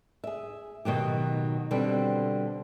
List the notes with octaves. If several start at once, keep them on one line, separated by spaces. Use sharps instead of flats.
G#4 E5
B2 D#3 F#3 G4
B2 D3 G3 C4